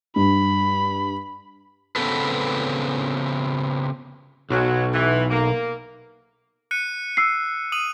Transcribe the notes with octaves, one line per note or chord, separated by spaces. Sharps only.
G2 B5
C#3 F#3 B3 C4 A4 B4
B1 F#3
E3
A#3
F#6 C#7 D#7
E6 C7
D#6 D#7 F#7